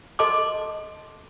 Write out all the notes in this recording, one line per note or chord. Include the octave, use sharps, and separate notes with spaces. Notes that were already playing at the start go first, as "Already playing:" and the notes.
A4 D#5 A5 C6 D6